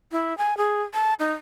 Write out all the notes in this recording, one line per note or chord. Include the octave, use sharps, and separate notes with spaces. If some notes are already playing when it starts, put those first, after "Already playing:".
E4
G#5
G#4
A5
D#4